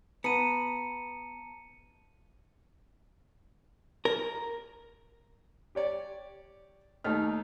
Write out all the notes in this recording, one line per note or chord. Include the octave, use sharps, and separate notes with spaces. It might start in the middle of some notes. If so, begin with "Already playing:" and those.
B3 A5 A#5 C#7 D#7
A#4
G4 C#5 D5
D#2 A3 D#4 F6